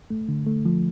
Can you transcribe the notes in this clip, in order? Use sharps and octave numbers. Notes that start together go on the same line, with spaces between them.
A3
D3
A3
F3